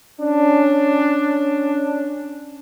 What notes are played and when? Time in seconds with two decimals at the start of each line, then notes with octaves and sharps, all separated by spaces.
0.20 C#4 D4